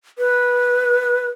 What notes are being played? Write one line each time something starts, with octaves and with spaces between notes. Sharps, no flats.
B4